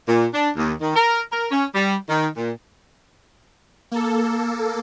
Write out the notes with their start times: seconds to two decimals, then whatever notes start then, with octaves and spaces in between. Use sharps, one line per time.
0.07 A#2
0.33 D4
0.56 D#2
0.80 D#3
0.95 A#4
1.31 A#4
1.50 C#4
1.74 G3
2.08 D#3
2.35 A#2
3.91 A#3 A4